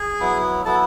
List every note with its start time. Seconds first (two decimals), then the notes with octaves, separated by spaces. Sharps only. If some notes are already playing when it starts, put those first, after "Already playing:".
Already playing: G#4 G#5
0.20 F#3 B3 E4
0.65 F#3 B3 E4 A4 A5